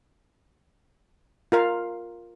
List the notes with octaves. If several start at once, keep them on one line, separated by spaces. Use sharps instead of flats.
F4 A#4 F5